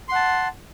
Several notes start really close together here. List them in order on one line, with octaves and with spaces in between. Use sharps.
C6 F#5 A5